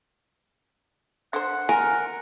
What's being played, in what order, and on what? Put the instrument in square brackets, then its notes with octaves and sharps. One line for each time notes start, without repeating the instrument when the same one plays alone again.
[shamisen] D3 C5 [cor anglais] F#5
[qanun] A#4 [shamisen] G#5